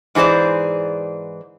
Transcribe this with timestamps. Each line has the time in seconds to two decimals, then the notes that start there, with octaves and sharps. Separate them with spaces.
0.15 G#2 E3 G#4 C5 D5